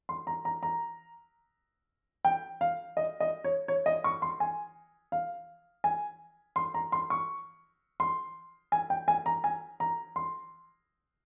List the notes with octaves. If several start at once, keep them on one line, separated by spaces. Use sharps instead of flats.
C6
A#5
A#5
A#5
G5
F5
D#5
D#5
C#5
C#5
D#5
C#6
C6
G#5
F5
G#5
C6
A#5
C6
C#6
C6
G#5
G5
G#5
A#5
G#5
A#5
C6